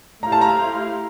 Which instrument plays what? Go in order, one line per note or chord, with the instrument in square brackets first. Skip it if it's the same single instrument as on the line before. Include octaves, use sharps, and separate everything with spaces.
[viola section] A3 E4 G4 C5 F5 [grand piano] A#5
[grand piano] A5
A#5